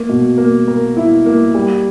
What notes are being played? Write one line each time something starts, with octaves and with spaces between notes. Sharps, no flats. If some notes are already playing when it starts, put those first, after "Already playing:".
Already playing: A#3
B2
A#3
A#4
E4
A#3
G3